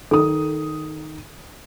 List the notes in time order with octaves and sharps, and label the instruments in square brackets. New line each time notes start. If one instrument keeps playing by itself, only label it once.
[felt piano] D#3 D#6 [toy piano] A4